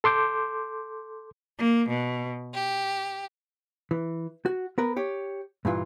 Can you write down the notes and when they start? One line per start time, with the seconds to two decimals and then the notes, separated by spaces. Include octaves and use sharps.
0.04 A4 C6 D6 G6
1.57 A#3
1.88 B2
2.54 G4
3.91 E3
4.46 F#4
4.78 B3 A#4 B4
4.96 G4 C#5
5.65 G2 A#2 E3 F4